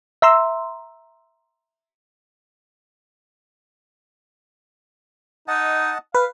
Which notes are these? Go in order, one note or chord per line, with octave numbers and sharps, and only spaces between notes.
E5 A#5 C6 E6
D#4 D#5 F#5 A5
B4 F5